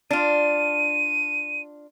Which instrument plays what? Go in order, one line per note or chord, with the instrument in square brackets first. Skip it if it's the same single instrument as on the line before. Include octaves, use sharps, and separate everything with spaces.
[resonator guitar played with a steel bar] D4 F4 [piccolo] D#7